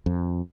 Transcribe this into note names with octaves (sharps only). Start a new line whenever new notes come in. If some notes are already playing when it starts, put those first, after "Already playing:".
F2